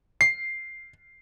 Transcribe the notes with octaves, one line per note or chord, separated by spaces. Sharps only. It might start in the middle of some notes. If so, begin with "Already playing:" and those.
C7